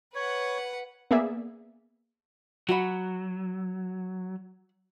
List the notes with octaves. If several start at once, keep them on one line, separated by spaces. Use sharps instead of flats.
B4 C#5 F#5
A#3 B3 G#4 D5 E5
F#3 F#4 F#5 B5